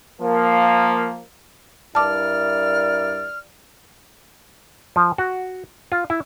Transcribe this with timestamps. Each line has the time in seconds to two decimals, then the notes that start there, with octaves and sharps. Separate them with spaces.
0.20 F3 A#3
1.95 G2 E4 A#4 D5 A5 D6 F6
4.96 F3
5.18 F#4
5.92 F4
6.10 E4